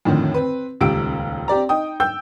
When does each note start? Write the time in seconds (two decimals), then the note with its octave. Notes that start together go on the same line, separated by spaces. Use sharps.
0.05 F2 A2 D3 D#3
0.34 C4 B4
0.81 D#1 C#2 G4 E6 D7
1.48 C4 G4 D5 A#5
1.69 D#4 G5 D#6
2.00 G5 E6 G6